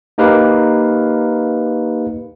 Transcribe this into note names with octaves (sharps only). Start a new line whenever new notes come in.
A#3 D#4 G4 A#4 B4 F5